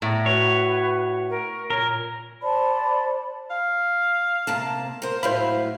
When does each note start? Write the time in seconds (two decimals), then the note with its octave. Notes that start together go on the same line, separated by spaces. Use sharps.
0.02 A2 A#5
0.26 F#4 B4 C#5
1.30 A#4
1.70 A#2 A#4 C#5
2.42 C5 D5 A5 B5
3.50 F5
4.47 C3 A#3 A5
5.02 A#4 C5
5.23 A2 F#3 C5 E5 F5 B5